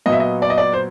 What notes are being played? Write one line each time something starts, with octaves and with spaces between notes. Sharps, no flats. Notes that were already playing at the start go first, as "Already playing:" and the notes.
A#2 F#3 B3 D#5
E5
D#5
D5
D#5
D5
C5